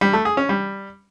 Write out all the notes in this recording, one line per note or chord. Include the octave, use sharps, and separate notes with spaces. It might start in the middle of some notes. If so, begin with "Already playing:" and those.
G3
A3
G#4
C#4
G3